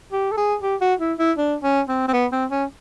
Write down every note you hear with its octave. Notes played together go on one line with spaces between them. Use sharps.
G4
A4
G#4
G4
F#4
E4
E4
D4
C#4
C4
C4
B3
C4
C#4